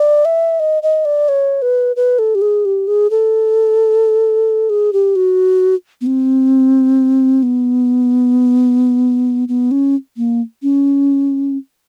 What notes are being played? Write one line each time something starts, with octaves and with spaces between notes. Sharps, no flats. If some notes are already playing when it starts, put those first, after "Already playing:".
Already playing: D5
E5
D#5
D#5
D5
C#5
B4
B4
A4
G4
G#4
G4
G#4
A4
G#4
G4
F#4
B3
C4
B3
B3
C#4
A#3
C#4